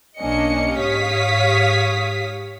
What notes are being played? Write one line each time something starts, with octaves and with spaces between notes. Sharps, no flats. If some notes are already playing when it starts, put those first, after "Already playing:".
B1 A#3 C#4 D4 D#5 C#7
G#2 G4 C#5 F5 D#6 B6